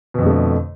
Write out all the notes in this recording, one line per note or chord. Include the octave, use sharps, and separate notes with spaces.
F2 B2 D3 A3